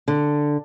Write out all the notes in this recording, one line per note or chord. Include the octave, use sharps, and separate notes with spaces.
D3